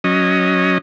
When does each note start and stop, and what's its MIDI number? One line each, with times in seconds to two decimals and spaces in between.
0.04 0.78 54
0.04 0.78 61
0.04 0.78 75